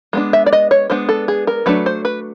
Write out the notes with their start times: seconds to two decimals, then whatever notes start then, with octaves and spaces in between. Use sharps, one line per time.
0.13 G#3 B3 D4
0.33 E5
0.46 D5
0.53 D#5
0.71 C#5
0.90 G#3 B3 D4 C5
1.09 A4
1.28 G#4
1.47 A#4
1.66 F#3 A3 D4 B4
1.86 C5
2.05 B4